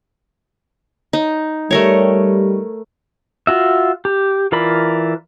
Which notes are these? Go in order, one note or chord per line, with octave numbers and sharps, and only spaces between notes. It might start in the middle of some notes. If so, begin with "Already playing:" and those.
D#4
G3 A3 A#4 C#5
F4 F#4 E5
G4
E3 F4 A#4 D5 B5